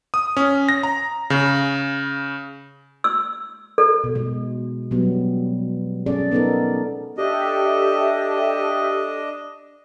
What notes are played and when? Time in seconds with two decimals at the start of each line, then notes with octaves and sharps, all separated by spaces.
0.14 D#6
0.37 C#4
0.69 A#6
0.83 A#5
1.30 C#3
3.04 E6
3.78 A4
4.04 B2
4.15 B2 G#3
4.91 B2 F#3 G3 B3
6.06 C#4 G#4 A4 D5
6.31 B3 D#4 A4 A#4
7.17 D4 G4 A4 D#5 E5